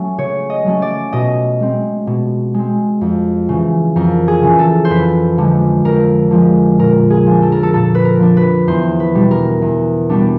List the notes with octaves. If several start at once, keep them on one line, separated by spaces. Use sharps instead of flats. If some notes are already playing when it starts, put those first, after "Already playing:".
Already playing: F#3 A3 C#4
C#3 C#5
D#5
F#3 A3 C#4
D5
B2 D#5
G#3 C4
B2
G#3 C4
F2
C#3 E3
F2 A#4
G#4
C#3 E3
A4
C5
F2 B4
D3 F3 G#3
F2 A#4
D3 F3 G#3
A#2 A#4
G#4
F3 A#3 D4
A4
A#4
A4
A#2 A4
B4
A#4
F3 A#3 D4
B4
E2 C5
B4
B2 G3 B3 D4
A#4
E2
B2 G3 B3 D4